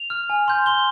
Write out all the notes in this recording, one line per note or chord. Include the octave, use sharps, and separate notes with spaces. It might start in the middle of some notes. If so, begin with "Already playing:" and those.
Already playing: F7
F6
G#5
C6 G6
C6 G7